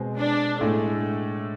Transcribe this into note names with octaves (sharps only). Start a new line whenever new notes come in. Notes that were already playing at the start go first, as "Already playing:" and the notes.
Already playing: B2 G#3 C4
D4
A2 G#3 A3 D4
A3